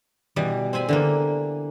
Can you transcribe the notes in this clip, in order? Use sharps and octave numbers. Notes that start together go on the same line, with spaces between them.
B2 E3 G3
C4 C5 G#5 B5
D3 E3 A#3